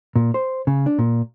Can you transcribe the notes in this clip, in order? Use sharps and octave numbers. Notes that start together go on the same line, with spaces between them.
A#2
C5
C#3
D4
A#2